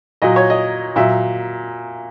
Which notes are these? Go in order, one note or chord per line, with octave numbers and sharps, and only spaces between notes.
A#2 F#3 D#5
C#5
D#5
A#2 F#3 E5